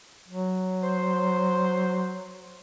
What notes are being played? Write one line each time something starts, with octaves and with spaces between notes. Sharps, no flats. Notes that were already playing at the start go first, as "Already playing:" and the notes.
F#3
C5